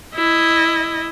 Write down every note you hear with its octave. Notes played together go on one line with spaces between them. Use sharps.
E4 D#5